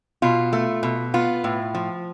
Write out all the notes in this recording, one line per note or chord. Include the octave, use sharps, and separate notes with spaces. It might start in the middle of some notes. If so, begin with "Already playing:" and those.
B2 F4
A3
B2
B3 F4
A2
F3